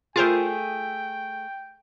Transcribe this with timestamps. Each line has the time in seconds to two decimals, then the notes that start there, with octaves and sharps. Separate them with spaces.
0.16 A3 F4 G#4 A#4 C5 G5